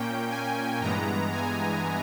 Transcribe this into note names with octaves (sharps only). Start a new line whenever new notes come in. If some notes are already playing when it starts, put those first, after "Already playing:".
Already playing: A#2 A#3 C#4 G5
G#5
G2 E3 G#3 B3 A#5
G#5